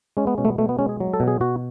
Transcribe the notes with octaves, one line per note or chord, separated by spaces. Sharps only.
G#3 C#4
B3
B2 C#4
A3
B3
B2 A3
B3
G#3 C#4
G#4
F#3
A4
B2
G#4
B2 F#4